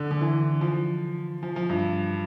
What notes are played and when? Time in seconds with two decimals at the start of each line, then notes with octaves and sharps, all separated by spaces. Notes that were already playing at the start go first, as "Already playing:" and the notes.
Already playing: D3
0.11 D3
0.21 E3
0.61 F3
1.43 F3
1.56 F3
1.69 G2